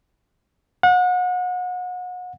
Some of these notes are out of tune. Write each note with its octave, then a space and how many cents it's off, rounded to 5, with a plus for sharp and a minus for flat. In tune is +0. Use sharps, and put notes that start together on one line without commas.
F#5 -35